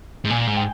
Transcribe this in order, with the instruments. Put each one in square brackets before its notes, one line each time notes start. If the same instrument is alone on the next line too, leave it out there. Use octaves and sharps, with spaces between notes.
[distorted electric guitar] G#2
[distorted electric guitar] A#2 [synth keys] G#5
[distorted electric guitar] G#2
[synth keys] G5